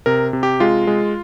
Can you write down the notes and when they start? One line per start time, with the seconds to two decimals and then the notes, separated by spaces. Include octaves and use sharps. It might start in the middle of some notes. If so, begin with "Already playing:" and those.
0.06 C3 A#4
0.33 C3
0.43 G4
0.60 G#3 F4
0.87 G#3